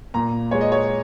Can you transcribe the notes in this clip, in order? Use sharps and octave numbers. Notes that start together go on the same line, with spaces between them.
A#2 A#5
G#3 C#5
D#5
C#5